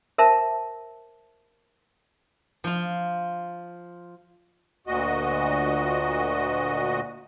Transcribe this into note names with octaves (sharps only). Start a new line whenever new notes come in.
A#4 C5 E5 A5
F3 F4
D2 A#2 F#4 D#5